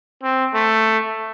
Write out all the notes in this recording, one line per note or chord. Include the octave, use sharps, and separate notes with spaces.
C4
A3